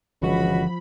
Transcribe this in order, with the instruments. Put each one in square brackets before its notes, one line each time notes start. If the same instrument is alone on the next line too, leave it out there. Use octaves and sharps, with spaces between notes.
[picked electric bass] G1 D3 E3 [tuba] C#2 [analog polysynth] F3 B5 [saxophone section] F#4